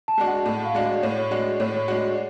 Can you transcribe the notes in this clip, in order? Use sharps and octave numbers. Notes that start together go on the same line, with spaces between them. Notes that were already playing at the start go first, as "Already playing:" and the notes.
A5
G#3 D4 F#4
F#5
A2
F5
G#3 D4 F#4
D5
A2 C#5
G#3 D4 F#4
A2 C#5
G#3 D4 F#4